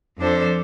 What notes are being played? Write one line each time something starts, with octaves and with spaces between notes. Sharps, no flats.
F2 F3 D4 A4 C5